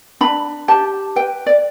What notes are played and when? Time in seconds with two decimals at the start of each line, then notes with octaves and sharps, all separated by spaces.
0.21 D4 B5
0.68 G4 A5
1.16 B4 G5
1.46 D5